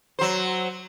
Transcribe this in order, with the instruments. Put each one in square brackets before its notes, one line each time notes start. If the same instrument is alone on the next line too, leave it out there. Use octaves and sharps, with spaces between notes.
[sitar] F#3 C5